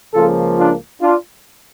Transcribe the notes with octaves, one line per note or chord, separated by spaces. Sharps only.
C#2 C#3 F3 A#3 F4 A4
D4 F4
D4 F4